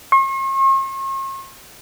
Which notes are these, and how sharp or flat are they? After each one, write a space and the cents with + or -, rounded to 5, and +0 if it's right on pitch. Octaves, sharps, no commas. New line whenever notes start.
C#6 -45